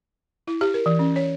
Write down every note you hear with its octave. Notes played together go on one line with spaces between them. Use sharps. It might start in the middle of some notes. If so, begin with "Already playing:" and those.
E4
G4
A#4
E3
C#4
C#5